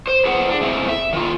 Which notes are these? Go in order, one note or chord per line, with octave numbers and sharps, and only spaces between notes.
C5
G#4 B4 C5 F#5
D4
C3 G#3 A3 E4
E5
D#3 F4